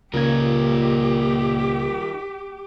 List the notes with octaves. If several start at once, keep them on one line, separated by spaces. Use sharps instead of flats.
C#2 A#2 D#4 F4 G4 A#4 G#6